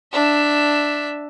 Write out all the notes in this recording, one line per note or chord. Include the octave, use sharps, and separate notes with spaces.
D4 E5